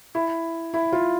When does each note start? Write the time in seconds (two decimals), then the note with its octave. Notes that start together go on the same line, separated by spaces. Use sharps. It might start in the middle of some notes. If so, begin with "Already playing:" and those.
0.15 E4
0.74 E4
0.93 F4